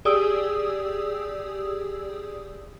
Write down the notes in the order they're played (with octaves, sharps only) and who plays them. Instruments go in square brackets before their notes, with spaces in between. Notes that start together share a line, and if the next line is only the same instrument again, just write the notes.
[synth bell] G4 G#4 D5 D#6 E6